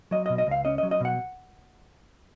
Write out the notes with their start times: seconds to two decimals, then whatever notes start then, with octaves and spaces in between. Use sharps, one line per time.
0.11 F#3 D#5
0.26 D#5
0.30 B2
0.38 D#5
0.47 C#2 F5
0.65 C#4 D#5
0.78 D#5
0.83 F#3
0.91 D#5
1.00 B2 F#5